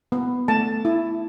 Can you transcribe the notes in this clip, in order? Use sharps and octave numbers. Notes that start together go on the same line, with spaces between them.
B3
A3 A5
E4